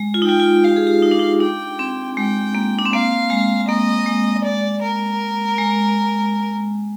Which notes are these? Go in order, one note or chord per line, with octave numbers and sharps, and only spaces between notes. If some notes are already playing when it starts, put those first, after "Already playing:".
Already playing: G#3
F4
D#4
F4 G5
F4
G4 F5
G#4
G4
D#4
D4
D#4
D4 G5
C4
G#3 G5
A#3
D4
C4
A#3 F5
G#3
A#3 D#5
G#3
D5
A#4
G#3